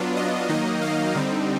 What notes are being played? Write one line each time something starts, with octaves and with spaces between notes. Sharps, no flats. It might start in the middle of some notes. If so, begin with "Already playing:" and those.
Already playing: F#3 B3 D4 F4
D#5
D#3 F#3 A#3 D#4 D#5
F5
D3 G3 C4 D#4